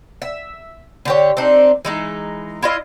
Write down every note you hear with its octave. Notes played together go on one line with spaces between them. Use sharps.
E5
D3 G4 C#5
C4 D4 D#4
E3 G#3 D#4
E4 F4 D#5